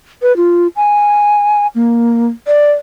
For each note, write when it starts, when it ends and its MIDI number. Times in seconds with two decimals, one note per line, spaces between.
0.22 0.35 71
0.37 0.67 65
0.76 1.67 80
1.75 2.27 58
2.47 2.72 74